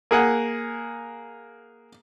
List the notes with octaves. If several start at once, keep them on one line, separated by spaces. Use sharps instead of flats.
A#3 G#4 F#5